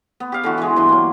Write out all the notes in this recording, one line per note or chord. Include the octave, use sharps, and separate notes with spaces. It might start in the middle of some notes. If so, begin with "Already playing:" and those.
B3
G4 F5
D3 E3 F#4
E3 G#3
G2 B2 E3 C6
F#3 A#3